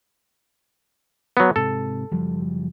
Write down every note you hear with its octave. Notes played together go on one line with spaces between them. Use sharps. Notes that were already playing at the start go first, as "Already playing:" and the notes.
F#3 B3
G#2 C3 A4
F#1 F3 G3